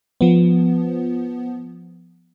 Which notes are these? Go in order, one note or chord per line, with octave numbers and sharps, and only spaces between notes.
F3 B3